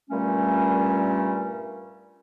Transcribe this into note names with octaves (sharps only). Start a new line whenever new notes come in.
G2 A#2 G3 A3 C#4